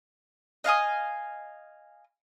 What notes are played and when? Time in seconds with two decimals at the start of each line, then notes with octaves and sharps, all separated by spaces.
0.64 D#5 F5 G#5 D#6